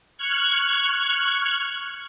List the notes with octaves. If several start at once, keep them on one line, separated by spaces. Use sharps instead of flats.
C#6 F6 F#6 G#6